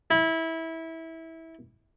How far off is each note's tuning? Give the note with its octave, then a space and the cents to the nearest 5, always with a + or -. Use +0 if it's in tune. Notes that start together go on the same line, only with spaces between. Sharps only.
E4 -20